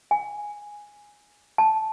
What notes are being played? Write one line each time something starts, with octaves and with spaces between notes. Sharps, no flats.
G#5
A5